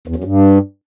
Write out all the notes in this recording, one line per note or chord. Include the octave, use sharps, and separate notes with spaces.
E2
F#2
G2